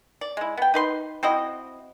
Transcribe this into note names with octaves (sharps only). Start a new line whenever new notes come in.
D5
G#3 E4
B3 G5
D#4 B4 C6
C4 E4 F#4 D#5